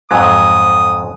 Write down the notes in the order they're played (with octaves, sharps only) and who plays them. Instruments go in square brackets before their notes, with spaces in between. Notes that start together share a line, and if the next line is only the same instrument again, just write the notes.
[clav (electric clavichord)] F2 G#2 F#3 [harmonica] D#6